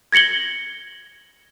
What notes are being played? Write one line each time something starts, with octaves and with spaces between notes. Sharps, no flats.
G#6 A#6 C#7 F#7 G7